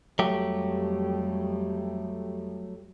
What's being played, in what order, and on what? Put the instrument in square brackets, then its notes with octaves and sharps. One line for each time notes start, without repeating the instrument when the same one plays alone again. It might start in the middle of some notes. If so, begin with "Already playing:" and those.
[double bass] F2 G3 [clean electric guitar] F#3 A3 G4